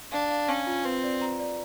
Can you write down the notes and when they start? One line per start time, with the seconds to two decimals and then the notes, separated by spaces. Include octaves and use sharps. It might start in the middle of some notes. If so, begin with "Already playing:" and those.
0.12 D4 F5
0.30 F5
0.49 C#4 F5
0.67 F4
0.85 C4 B4
1.03 D5
1.21 A#5
1.40 D5